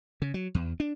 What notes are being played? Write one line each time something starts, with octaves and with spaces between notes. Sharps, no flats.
C#3
F#3
E2
D4